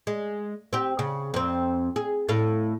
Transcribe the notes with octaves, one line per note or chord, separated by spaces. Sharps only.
G#3
C4 G4
C#3
F2 C4
G#4
A2 A4 F5